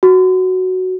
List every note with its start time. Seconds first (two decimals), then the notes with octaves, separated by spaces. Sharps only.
0.03 F#4